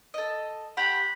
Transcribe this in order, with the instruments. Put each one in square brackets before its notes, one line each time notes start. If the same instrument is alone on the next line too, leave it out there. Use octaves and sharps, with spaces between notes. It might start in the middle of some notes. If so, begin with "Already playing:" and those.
[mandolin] A4 D#5
[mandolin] G4 F#5 [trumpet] B5